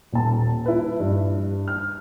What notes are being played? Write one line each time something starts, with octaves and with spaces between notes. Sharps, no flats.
D#1 A5
E4 B4
G2
F6